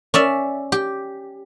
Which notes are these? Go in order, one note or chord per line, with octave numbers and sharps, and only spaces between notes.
C#4 D5 E5
G4